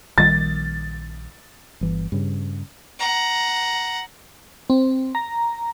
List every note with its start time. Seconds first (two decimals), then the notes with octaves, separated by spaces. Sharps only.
0.18 A#1 D#3 G3 A6
1.81 G1 E3
2.12 G2 C#3
2.99 F#5 A#5
4.70 C4
5.15 A#5